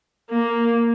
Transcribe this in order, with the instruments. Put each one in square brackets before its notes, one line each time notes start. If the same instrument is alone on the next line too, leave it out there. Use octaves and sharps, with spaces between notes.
[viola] A#3